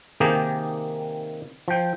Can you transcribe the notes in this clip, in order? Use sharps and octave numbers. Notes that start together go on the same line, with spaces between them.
C3 D#3 A#3 D#4 G4 G#4
F3 G5